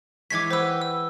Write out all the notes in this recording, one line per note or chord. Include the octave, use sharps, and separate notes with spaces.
E3 G#3 C#5 D6 G#6 B6
G4 B4 C5 F#5 E6
E6